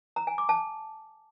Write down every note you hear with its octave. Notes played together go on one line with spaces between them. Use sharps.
A#5
G#5
D6
A5